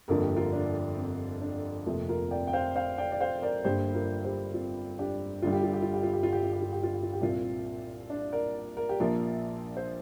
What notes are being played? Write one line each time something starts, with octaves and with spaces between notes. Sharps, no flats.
G1 F2 D3 F3 A#3 A#4
G4
F4 A#4
D4
C4
D4
F1 F2 C3 F3 A#3 C4 F4
F4 A#4
D5 G5
G5
C5 F5
C5 F5
D5 G5
D5
C5 F5
A#4 D5
G1 G2 G3 A#3 G4 C5
F4 A#4
G4 C5
C4 F4
D4 G4
G1 G2 G3 F4
G4
F4
G4
F4
G4
F4
G4
F4
G4
F4
G4
F4
G4
F4
G4
F4
G4
C2 A#2 A#3 C4 F4
D4
A#4 D5
A#4
G4
A#1 A#2 F3 A#3 F4 A#4
C5